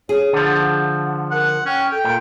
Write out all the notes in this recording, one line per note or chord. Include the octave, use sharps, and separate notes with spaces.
G#4 C#5
D3 F3 F#5
A#4 F#5
C#4 G5
A4 G5
A#2